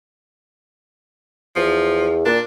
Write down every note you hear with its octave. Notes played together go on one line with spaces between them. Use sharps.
E2 F3
A#2 D4